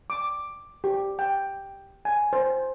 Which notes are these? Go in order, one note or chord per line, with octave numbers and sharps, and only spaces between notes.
D6
G4
G5
G#5
C5